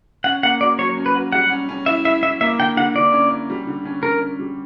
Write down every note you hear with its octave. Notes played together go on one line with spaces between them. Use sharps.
C#4 F#5
A#3 F#5
F#4 D5
F#3 C#5
C#4
B4
F#4
G3 F#5
C#4
C#4
E4 E5
E4 E5
E4 E5
A#3 E5
D3 G5
D3 F#5
D3 D5
C#4
C#4
G3
D3
C#4
D3 A#4
C#4
G3